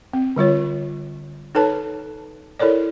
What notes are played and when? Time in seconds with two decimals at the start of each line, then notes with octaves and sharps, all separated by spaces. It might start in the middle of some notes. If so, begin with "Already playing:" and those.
0.13 C4
0.36 D3 G3 F4 C#5
1.55 D#4 A4 B4 C#5 A5
2.59 E4 A4 A#4 C#5 D5